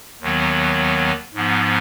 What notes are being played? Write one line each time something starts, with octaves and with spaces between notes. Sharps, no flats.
D#2 D#3 F#3 B3
G#2 F3 B3